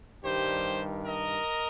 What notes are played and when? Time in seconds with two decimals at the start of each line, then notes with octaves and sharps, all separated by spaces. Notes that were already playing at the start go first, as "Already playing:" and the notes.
0.22 G2 D#3 G3 G4 C5
1.05 A#4 D#5